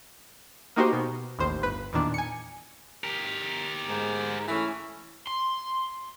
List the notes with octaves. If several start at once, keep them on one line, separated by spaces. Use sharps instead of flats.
A#3 D#4 F#4 G4 C5
B2
A1 D#2 C5
G1 B4
E2 A#2 D#3 D4
G#5 C#7
G4 A#4
G#2
E3 A3 C#4
C6